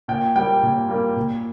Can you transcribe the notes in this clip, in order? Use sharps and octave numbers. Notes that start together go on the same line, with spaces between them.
A#2 G5
G3 A#3 G5
A#2
G3 A#3
A#2